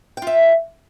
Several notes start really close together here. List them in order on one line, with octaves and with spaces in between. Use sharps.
G5 F4 E5